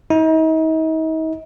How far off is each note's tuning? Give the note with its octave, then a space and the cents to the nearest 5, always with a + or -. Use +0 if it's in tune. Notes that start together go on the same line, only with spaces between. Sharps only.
D#4 +40